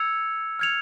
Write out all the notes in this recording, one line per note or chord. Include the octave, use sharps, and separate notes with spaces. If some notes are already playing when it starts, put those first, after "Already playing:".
Already playing: E6 G#6 C#7 F7
F6 G#6 C#7 F7